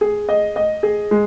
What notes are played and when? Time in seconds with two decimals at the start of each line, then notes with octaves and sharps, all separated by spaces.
0.01 G#4
0.29 D#5
0.56 D#5
0.83 G#4
1.11 G#3